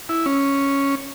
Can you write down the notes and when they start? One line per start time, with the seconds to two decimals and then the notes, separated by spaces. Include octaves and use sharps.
0.09 E4
0.26 C#4